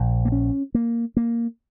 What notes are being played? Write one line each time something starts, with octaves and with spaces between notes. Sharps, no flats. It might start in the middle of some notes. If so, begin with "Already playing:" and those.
Already playing: A#1 A#2
A#3
C#4
A#3
A#3